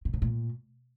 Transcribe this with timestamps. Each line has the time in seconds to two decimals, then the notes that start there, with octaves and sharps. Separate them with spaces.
0.05 C3
0.14 C#3
0.22 A#2